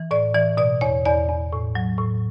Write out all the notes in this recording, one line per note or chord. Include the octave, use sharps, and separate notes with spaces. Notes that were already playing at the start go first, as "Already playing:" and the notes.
Already playing: E3
A2 D5
E3 D5
B2 D5
E2 C#5
E2 D5
E2
A2
F#3
A2